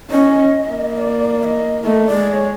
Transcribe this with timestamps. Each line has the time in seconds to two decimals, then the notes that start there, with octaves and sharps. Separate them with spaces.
0.11 C#4 D#5
0.68 A#3
0.97 D5
1.41 F5
1.45 D#5
1.84 A3 D#5
2.06 D5
2.14 G#3
2.29 D5
2.33 C#5